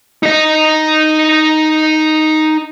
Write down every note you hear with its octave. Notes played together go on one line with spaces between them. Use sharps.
D#4 D#5